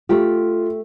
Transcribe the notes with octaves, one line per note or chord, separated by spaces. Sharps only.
A3 F4 G4